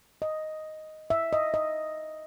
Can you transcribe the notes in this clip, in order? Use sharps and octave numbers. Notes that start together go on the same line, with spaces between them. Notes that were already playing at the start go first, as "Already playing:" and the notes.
D#5
E5
D#5
D#5